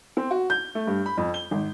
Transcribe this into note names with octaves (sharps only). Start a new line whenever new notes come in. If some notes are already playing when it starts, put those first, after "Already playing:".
C4
F#4
G6
A3
G2
B5
F2
G7
G#1